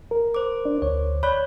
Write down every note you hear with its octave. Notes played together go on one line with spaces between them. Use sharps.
A#4
C5 D6
D4
D2 C#5
C#5 D5 B5 F#6